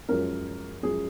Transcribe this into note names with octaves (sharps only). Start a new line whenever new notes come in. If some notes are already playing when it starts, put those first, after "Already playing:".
F#2 F3 G#3 C#4 A#4
F#2 F3 G#3 C#4 G#4